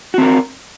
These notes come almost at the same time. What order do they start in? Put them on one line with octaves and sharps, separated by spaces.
F#4 C4 A#4